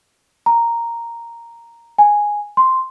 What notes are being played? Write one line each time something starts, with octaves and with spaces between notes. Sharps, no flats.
A#5
G#5
C6